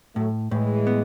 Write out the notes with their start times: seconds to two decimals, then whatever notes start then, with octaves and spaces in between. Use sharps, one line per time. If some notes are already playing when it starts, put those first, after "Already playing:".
0.15 A2 F#3 A3
0.51 A2 E3 G#3
0.87 B3